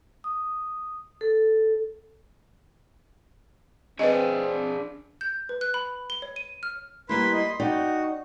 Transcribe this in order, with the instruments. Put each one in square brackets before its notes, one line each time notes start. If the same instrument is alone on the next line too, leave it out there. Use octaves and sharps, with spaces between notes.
[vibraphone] D#6
A4
[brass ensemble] C4 [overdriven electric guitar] D4 G#4 [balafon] B4 D5 D#5
[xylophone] G6
B4
F#6
B5
G7
C#5
D#7
F6
[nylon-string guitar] G3 A#3 E4 [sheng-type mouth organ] B4 B5 C6
[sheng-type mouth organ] D#5 B5 C6
[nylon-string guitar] D#4 D5 G5 [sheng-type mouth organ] F#4